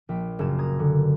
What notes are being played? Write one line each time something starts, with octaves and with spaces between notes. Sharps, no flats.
A#1 G5 B6
F#1 C#3 G#6 E7
A#5 D#6 G#6
D3